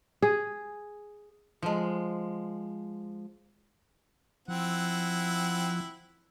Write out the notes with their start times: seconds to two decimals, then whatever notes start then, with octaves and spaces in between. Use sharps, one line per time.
0.22 G#4
1.63 F3 G#3
4.48 F3 C4 E4 F#5